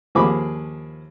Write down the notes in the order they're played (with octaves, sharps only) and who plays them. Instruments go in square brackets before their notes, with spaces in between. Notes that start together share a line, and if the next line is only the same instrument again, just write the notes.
[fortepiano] D#2 F3 A#3 G#4 B5 D6